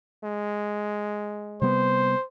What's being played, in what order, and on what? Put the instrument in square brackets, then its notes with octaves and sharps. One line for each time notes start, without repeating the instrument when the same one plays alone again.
[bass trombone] G#3
[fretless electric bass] C3 G3 B3 [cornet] C5